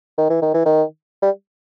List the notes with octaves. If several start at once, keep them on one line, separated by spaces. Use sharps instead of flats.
D#3
E3
D#3
E3
D#3
G3